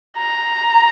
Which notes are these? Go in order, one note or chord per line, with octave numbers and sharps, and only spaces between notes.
A#5